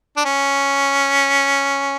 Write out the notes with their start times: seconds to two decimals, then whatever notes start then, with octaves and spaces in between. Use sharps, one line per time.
0.16 D4
0.25 C#4